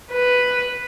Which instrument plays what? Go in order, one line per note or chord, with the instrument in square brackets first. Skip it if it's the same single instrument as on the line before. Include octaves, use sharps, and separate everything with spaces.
[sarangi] B4